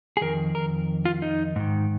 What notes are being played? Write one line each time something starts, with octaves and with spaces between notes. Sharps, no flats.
G#4
F2 D#3 A#4
A#4
F4
D#4
G#2 D#3